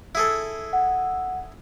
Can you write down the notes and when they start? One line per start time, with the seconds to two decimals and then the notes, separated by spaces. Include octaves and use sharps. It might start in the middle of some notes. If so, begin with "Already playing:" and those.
0.15 E4 G#4 A4
0.73 F#5